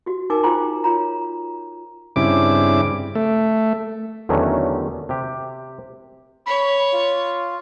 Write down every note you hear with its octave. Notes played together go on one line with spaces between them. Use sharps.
F#4 G4
D#4 A#4 G#5 D6
F4 G#4 C5 G5 A#5 C6
F4 C#5 A#5
G2 C#3 C4 E4 D6
A3
E2 D3 D#3 F#3 A3 C#4
C3 G4
C#5 B5
F4